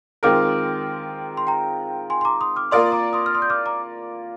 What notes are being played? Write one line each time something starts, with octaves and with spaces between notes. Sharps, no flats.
D#3 G#3 C4 F4 A#4 D6 F6
C6
G5 A#5
G#5 C6
C6
A#5 D6
C6 D#6
D6 F6
A#3 F4 A#4 D5 C6 D#6
A#5 D6
C6 D#6
F6
C6 D#6
G6
D6 F6
A#5 D6